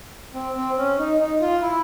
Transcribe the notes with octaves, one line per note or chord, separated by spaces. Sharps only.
C4
C4
C#4
D#4
D#4
F4
E4